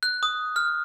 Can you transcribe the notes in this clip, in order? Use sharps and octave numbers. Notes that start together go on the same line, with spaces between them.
F#6
D#6
F6